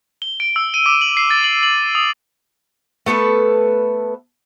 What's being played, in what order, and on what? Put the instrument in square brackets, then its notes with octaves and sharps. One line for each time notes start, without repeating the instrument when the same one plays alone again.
[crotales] G7
D7
E6
D#7
D6
F#7
C7
A6
F#7
F#7
D#6
[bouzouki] A3 B3 A4 B4